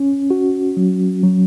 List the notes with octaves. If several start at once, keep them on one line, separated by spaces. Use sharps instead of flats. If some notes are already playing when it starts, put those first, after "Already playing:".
Already playing: C#4
F#4
F#3
F#3